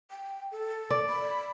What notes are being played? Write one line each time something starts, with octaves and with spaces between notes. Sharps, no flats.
G5
A4
D5
B5